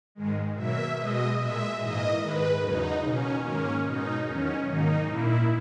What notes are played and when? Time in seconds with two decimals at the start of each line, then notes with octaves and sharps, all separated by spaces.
0.15 G#2 D#3 G#3
0.55 B2 F#3 A#3 E5
0.96 B2 G#3 D#5
1.38 A#2 G#3 E5
1.79 G#2 E3 A#3 D#5
2.20 G#2 D#3 G#3 B4
2.61 E2 C#3 F#3 D#4
3.02 B2 A#3 C#4
3.43 G#2 D#3 A#3 C#4
3.84 B2 G#3 D#4
4.25 E2 D#3 F#3 C#4
4.67 G#2 D#3 A#3 D#4
5.08 A#2 A#3 E4